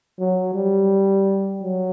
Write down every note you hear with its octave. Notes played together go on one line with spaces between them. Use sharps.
F#3
G3
F#3